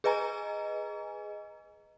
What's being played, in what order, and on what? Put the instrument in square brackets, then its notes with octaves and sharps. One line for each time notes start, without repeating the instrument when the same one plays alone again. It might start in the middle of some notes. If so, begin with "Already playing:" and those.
[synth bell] G#4 B4 D#5 G#5 A#5